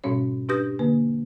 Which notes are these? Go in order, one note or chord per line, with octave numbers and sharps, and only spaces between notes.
G#2 B2 G3 C#4 C#5
D4 G4 B4 D#6 G6 A#6
D3 A#3 B4